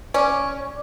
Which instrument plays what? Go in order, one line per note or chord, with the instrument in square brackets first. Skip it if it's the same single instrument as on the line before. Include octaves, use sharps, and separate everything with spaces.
[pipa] C#4 [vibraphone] D5 D6